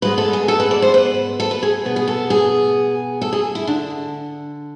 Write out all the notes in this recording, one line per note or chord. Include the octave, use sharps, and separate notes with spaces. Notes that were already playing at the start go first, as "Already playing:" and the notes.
G#2 G#3 B3 B4
A4
G#4
A4
B4
D5
C5
B4
A4
B4
G#4
B2 B3 B4
G#4
A4
G#4
A4
G#4
E4
D3 D4